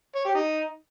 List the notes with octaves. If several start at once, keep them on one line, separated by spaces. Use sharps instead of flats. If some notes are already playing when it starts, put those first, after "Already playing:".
C#5
G4
D#4